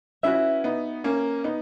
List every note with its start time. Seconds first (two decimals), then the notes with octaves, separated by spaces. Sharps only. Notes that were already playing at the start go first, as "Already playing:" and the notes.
0.23 C#4 E4 F#4 B4 E5
0.64 B3 D#4
1.04 A#3 C#4
1.44 B3 D#4